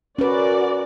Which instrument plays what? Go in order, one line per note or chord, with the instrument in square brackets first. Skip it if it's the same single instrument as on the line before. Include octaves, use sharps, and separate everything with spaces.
[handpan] C#4 B4 [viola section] F#4 A#4 D5